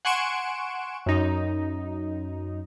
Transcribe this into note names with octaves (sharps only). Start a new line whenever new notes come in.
F#5 G#5 C6 C#6 D7 E7
F#2 D#4